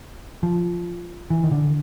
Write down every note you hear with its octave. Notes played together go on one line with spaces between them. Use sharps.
F3
E3
D#3
D3